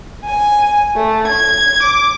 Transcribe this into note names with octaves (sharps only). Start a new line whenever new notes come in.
G#5
A3
G#6
D6